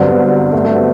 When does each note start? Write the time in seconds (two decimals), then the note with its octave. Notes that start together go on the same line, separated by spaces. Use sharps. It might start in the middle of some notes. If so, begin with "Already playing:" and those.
Already playing: G2 D3 F#3 C4
0.08 B3
0.52 A3
0.65 A3
0.76 B3